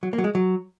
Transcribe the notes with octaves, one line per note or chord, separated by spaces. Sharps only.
F#3
A#3
F#3
G#3
F#3